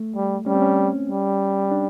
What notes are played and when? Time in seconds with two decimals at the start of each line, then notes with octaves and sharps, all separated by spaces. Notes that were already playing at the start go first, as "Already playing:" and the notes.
Already playing: A3
0.16 G3
0.46 G3 C#4
0.54 C4
0.62 C#4
1.10 G3
1.72 D4